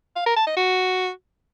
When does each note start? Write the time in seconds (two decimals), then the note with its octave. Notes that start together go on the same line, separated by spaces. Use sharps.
0.16 F5
0.26 A#4
0.36 A5
0.47 D#5
0.57 F#4